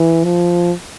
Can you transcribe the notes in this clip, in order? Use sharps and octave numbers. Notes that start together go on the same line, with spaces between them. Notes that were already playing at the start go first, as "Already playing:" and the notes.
Already playing: E3
F3